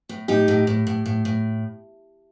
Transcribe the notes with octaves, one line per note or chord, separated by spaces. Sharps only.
A2
A2 D#4 G4
A2
A2
A2
A2
A2